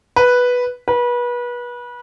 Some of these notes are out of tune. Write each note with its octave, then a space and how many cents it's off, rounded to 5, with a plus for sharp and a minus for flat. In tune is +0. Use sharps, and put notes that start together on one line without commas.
B4 -5
B4 -30